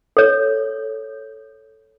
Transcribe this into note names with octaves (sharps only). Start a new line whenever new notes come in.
A4 C#5